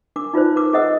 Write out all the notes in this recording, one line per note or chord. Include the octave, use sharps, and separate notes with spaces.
D4 A#4 D6
D#4 F4 B4 C5
A#4 B4 D6
G#4 C5 D#5 F#5 D#6 E6